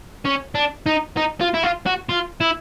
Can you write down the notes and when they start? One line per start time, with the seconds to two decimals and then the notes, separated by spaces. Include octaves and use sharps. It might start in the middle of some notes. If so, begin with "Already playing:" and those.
0.25 C#4
0.55 D4
0.86 D#4
1.17 D#4
1.40 F4
1.54 E4
1.63 F4
1.86 F#4
2.09 F4
2.41 E4